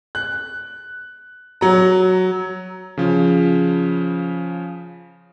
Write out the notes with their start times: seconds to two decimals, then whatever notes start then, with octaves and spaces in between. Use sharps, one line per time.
0.15 F#6
1.61 F#3 A#5
2.97 C#3 F3